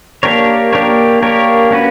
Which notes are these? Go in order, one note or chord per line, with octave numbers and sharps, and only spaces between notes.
A#3 D4 G4 A#4 C#5
A#3 D4 G4 A#4 C#5
A#3 D4 G4 A#4 C#5
A#3 C#4 F#4 B4